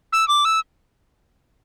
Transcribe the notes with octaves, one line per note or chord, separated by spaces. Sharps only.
E6
D6
E6